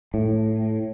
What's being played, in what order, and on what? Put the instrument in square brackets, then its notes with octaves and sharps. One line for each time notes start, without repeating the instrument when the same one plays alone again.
[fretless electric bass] A2